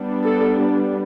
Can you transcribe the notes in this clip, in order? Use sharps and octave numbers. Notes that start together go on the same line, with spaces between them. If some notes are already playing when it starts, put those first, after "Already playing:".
Already playing: G3 B3 D4
A4